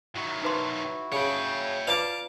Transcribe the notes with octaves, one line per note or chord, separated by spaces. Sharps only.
D#3 F#3 E4 F#4
D#4 B4 C6
C#3 C#5 G5
F4 B4 D5 F5 A5 D6